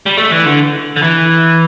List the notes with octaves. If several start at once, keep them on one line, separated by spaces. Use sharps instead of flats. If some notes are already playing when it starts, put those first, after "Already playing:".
G3
A3
E3
D3
D3
E3